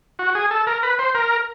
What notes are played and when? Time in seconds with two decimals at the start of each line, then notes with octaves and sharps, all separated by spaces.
0.19 F#4
0.35 G#4
0.51 A4
0.67 A#4
0.83 B4
0.99 C5
1.15 A#4